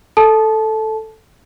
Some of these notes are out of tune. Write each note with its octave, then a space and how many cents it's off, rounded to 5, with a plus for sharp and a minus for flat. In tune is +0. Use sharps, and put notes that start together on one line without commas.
A4 +0 A5 -20